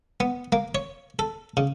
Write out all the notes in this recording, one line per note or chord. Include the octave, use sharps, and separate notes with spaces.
B3
A#3
C#5
A4
C#3